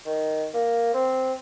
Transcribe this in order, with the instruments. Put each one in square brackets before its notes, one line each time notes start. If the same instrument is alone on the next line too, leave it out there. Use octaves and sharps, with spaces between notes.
[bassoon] D#3
A#3
C4